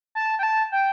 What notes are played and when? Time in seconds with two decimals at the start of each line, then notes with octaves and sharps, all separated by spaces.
0.15 A5
0.39 G5
0.43 A5
0.72 G5